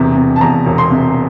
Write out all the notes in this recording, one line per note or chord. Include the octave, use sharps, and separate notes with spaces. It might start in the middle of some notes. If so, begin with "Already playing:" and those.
Already playing: E1 E2 C3 E3 A#5
C3
A5
E2 A#5
E1
C6
C3